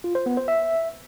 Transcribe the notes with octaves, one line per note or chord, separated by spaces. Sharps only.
F4
C5
B3
C5
E5